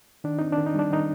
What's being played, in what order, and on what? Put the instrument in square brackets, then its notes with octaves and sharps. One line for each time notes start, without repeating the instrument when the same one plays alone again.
[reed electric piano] D#3 D4
C4 D#4
D4
D#3
D#4
G3 D4
D#3 D#4